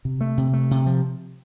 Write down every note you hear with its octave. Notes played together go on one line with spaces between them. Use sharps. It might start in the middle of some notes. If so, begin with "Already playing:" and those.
C3
A3
C3
A3
C3
F3